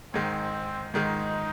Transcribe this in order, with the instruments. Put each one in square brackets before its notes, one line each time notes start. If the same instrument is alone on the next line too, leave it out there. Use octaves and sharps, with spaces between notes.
[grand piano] G#2 D#3 G#3 [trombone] C4
[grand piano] G#2 D#3 G#3 [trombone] D#4